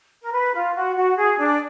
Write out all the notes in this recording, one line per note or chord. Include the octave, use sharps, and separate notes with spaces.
A#4
B4
F4
F#4
F#4
G#4
D4 D5